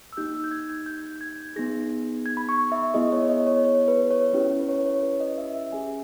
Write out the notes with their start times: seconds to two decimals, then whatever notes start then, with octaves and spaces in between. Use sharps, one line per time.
0.13 E6
0.17 A#3 D#4 G4 G6
0.35 E6
0.44 G6
0.51 G#6
0.69 G#6
0.86 G6
1.21 G#6
1.56 B3 D#4 G#4 A#6
2.26 G#6
2.37 B5
2.49 C#6
2.72 E5
2.94 B3 E4 G#4 D#5
3.07 D#5
3.12 C#5
3.29 D#5
3.47 C#5
3.65 C#5
3.88 B4
4.11 C#5
4.33 C#4 E4 G4
4.59 B4
4.69 C#5
4.86 C#5
5.03 B4
5.21 D#5
5.38 E5
5.55 E5
5.72 C#4 G#4 G#5